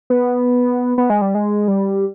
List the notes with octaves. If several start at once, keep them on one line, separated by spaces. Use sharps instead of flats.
B3
B3
G#3
G3
G#3
G3